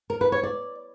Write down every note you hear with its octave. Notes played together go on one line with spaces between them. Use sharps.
A#4
B4
C#5
D5